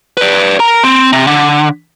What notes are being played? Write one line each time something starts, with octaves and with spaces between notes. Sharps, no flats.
B4 D5
A#4 A#5
C4
C3
D3